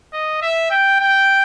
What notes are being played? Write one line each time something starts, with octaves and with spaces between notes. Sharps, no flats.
D#5
E5
G5
G5